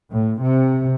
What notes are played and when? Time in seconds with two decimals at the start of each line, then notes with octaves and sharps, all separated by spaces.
0.11 A2
0.43 C3